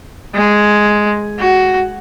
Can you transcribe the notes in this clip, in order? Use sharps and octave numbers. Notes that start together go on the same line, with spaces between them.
G#3
F#4